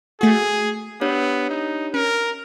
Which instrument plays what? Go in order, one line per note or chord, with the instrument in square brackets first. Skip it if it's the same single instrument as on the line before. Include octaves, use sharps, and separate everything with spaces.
[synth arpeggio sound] A3 F#4 [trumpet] G#4
[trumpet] B3 [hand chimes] D4 G4 C#5
[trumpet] D#4
[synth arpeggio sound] C#4 [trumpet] A#4